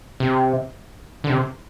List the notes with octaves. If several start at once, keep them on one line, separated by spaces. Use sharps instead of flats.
C3
D3
C3